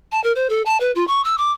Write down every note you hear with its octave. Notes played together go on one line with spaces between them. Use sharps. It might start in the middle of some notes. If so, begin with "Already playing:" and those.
A5
A#4
C5
A4
A5
B4
F4
C#6
E6
D6